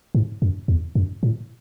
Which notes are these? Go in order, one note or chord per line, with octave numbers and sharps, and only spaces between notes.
G#2
F#2
E2
F#2
A2